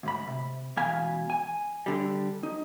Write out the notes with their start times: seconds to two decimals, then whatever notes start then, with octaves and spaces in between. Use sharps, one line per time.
0.03 D2 G#2 B5
0.28 C3
0.77 C#2 B2 E3 F5 G#5 B5
1.30 G#5
1.86 D3 G3
2.43 D#4